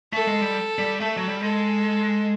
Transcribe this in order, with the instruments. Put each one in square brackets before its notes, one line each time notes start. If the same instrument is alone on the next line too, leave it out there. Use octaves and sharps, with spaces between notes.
[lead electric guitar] A3 [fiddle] A4
[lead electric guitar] G#3
G3
G3
[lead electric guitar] A3 [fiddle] A4
[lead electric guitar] F#3
G3
[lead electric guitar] G#3 [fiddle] A4